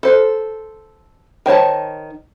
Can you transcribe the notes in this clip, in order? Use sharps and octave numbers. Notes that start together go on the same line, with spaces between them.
A4 C5
D#3 C5 C#5 A5